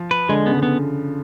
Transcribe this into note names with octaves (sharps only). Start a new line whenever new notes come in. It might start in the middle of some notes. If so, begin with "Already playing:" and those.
Already playing: F3
B4
D3 G#3
C#3 B3
D3
B3